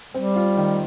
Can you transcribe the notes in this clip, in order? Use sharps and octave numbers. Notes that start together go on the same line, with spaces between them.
G3 C4
F4
D#3